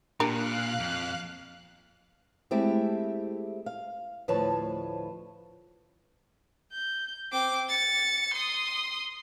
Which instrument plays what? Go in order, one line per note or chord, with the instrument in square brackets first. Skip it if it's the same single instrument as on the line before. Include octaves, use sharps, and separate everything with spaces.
[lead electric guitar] A#2 [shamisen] D4 G4 A#4 [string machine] F5 F#6
[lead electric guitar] F2
[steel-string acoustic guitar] G#3 A3 C4 E4 G4
F5
D2 A2 F3 B4 C#5 A5
[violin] G6
C4 D6
A6 C#7
C6 D#6